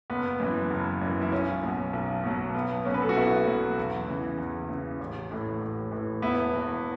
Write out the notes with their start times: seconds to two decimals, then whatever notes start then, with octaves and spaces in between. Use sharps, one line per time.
0.10 F#1 B3
0.40 F#2 E3
0.71 F#1
1.02 F#2 E3
1.21 E4
1.32 B1 C#4
1.63 B2 F#3
1.93 B1
2.23 B2 F#3
2.55 B1 B3
2.85 B2 F#3 C#4
2.94 B4
3.02 A4
3.09 F#4
3.16 B1 B3 E4
3.47 B2 F#3
3.77 E2
4.08 C#3 E3
4.38 E2
4.69 C#3 E3
5.00 A1
5.31 A2 E3
5.61 A1
5.92 A2 E3
6.22 E1 B3 E4
6.53 E2 E3